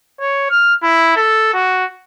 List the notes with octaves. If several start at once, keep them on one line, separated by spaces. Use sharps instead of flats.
C#5
F6
E4
A4
F#4